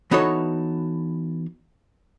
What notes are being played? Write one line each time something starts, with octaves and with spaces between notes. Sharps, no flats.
E3 B3 D#4 F#4 A4 C#5